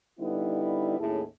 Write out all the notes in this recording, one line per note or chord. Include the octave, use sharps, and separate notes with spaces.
D3 G3 B3 D#4 E4
D#2 A2 C#4 E4 G#4 A4